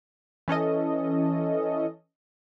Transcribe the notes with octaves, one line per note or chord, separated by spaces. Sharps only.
E3 C#4 A4 D#5